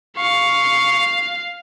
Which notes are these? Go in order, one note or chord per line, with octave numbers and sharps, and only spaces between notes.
F5 C#6